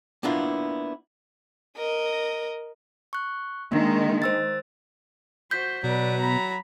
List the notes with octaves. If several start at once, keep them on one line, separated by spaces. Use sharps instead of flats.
A#3 B3 D4 E4 F4
A#4 D#5
C#6 F#6
D#3 G#3 A#3 D4
C5 E6 A6
F#4 C5 G6 B6
B2 F#3 B4 D5
A#5 B5